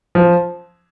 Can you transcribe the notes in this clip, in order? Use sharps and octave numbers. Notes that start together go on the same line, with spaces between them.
F3